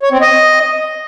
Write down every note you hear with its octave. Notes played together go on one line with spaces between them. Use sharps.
C#5
C4
D#5